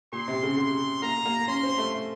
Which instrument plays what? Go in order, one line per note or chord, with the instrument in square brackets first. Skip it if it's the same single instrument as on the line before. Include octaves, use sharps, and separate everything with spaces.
[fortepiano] A#2 [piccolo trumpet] C6
[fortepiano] C3
C#3
[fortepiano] C#3 [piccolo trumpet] C6
[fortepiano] A#3 [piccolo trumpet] A#5
[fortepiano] A#3
[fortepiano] C#4 [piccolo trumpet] C6
[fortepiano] C4
A3